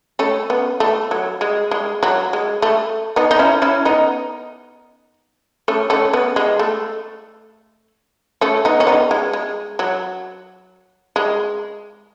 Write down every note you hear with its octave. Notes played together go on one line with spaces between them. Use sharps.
A3 C#4
B3
A3
F#3
G#3
G#3
F#3
G#3
A3
B3 D#4
D#4
C#4 E4
C#4 E4
B3 D#4
A3 C#4
A3 C#4
B3
G#3
A3
A3 C#4
B3 D#4
C#4
B3 D#4
G#3
G#3
F#3
G#3